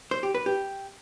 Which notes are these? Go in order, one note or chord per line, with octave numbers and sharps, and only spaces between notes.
C5
G4
B4
G4